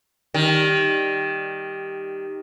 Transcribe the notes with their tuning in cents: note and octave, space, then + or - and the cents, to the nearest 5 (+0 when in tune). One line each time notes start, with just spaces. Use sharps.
D#3 +0 G3 +0